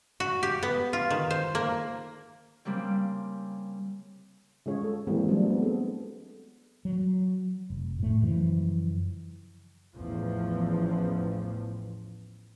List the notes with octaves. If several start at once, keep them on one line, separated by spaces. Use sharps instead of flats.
F#4
G4
B3
F4
D#3
C5
A#3
C#3 G3 A#3 C4
C#3 G#3 F4 G#4 C#5
A4
E3 G3 G#3 A#3 C4
F#3 G#3 A3 D4
B3 C4
G#4 A4
F#3
F1
A2 A3
F#2 C#3 E3 F3
A1 E2 F3